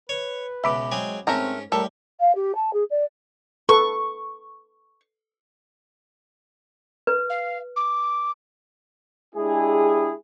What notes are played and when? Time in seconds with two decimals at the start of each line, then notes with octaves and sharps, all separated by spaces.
0.09 B4 C#5
0.64 C#2 B2 E5 B5 D6
0.92 F#3 G#3 C4 G#4
1.27 G#2 A3 C4 C#4 A#4 A#5
1.72 A2 G3 A4 A#4
2.20 F5
2.35 G4
2.55 A5
2.73 G#4
2.90 D5
3.69 A4 B4 C#6
7.07 B4
7.30 F5
7.76 D6
9.35 G#3 D4 E4 G4 G#4